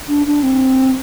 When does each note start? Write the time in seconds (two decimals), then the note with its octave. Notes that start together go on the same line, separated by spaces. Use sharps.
0.09 D4
0.27 D4
0.43 C4